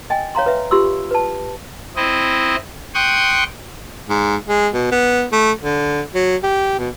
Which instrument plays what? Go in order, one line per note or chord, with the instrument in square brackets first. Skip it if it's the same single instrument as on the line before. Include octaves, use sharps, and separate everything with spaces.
[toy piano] D#5 G5 G#5
C#5 F5 A#5 C6
B4 E5
F4 G4 C6 E6
B4 A5
[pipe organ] C4 E4 D#5
G5 C6 C#6 D#6 F#6
[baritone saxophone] G#2
G#3
B2
B3
A3
D3
F#3
G4
B2